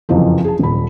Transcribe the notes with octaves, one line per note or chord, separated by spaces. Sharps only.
F#1 F2 C3 E3 F3
G#4 A5
D#1 B5